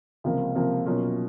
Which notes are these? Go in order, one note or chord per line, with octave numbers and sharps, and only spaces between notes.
C#2 C3 F3 A#3
C#2 C3 F3 A#3
B2 F#3 A#3 C#4 F4